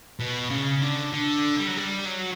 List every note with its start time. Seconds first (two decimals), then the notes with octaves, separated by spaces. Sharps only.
0.20 B2
0.50 C#3
0.81 D3
1.13 D3
1.58 G3
1.67 F#3
1.77 G3
2.05 F#3